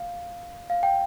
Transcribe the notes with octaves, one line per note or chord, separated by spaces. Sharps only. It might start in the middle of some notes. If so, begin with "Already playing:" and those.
Already playing: F5
F5
G5